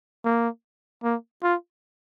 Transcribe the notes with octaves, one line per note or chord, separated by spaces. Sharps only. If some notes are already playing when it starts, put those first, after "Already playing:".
A#3
A#3
F4